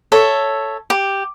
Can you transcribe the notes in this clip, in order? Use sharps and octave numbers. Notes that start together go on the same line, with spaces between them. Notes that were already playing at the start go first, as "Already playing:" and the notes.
A4 C#5 E5
G4